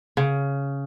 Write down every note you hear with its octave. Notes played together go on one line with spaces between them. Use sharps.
C#3